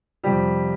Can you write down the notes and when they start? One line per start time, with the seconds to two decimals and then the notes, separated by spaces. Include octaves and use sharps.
0.24 F2 C3 F3 G3 G4